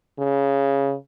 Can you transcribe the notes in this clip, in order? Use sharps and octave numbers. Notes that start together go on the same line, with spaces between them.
C#3